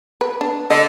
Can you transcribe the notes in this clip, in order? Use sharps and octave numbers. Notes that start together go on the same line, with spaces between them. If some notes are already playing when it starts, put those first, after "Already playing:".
B4
D4
D3 D#5